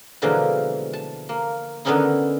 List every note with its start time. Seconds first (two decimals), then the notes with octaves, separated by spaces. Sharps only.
0.22 B2 D3 E3 F3 G#3 A#3
0.93 A5
1.29 A#3
1.85 D3 D#3 B3 C#4 D#4 E4